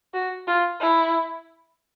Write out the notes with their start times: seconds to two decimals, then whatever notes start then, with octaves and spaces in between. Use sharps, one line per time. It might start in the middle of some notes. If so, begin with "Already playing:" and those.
0.14 F#4
0.47 F4
0.81 E4